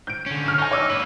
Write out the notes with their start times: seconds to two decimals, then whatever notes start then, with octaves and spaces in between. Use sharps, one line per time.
0.07 G6 D7
0.26 D3 C#4
0.44 C#6 F6
0.58 D#4 G#5 C#6
0.71 C#5 D6 E6
0.90 A#3 B4 F#7